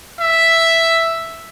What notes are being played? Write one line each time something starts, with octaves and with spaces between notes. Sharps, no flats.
E5